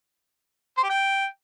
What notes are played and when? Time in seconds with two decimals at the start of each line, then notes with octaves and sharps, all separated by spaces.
0.77 C5
0.83 G4
0.90 G5